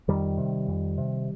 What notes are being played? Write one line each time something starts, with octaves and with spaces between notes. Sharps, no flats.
F2 D#3 G3
C3
F2
C3